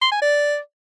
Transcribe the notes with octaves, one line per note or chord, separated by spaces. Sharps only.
C6
G#5
D5